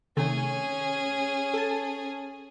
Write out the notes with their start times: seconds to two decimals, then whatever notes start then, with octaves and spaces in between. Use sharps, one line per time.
0.17 C3 D#3 A3 C#4 G#4
1.54 A4 A5